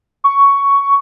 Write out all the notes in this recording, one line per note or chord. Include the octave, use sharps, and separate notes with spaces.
C#6